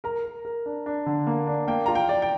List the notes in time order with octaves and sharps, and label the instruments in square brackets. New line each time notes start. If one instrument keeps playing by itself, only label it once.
[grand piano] A#4 [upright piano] A#5
[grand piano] A#4
A#4
D4
D4
D3
A#3
D4
[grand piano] A#3 [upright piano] G5
[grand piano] F4 [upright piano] A#5
[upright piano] G5
[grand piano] D5
[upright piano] G5